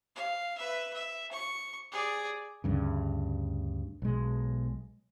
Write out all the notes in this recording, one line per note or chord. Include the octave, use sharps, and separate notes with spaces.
F5
B4 E5
E5
C#6
G#4 D5
D2 G2 C#3
B1 G#3